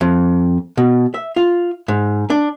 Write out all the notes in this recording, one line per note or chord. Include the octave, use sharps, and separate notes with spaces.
F2
B2
E5
F4
G#2
D4